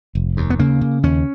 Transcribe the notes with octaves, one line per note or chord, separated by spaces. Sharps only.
F1
D#2
B3
C#3 A#3
C#3
D#2 C#4